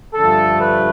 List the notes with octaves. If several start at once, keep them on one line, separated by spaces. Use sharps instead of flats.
G2 D3 F3 A3 A4
B4